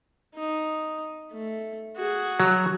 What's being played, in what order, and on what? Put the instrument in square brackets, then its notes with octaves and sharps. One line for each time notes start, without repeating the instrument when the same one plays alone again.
[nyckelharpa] D#4
A3
F#4 G#4
[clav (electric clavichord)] F#3